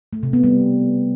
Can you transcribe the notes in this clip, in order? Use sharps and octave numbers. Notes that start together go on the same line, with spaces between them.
A3
C3
B3
G3